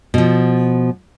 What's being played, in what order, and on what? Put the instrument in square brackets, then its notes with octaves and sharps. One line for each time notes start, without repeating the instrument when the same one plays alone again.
[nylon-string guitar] B2 F3